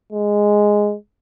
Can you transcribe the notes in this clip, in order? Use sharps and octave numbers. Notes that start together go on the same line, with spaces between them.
G#3